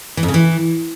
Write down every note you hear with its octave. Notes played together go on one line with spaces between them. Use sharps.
E3
F2
C#3
E3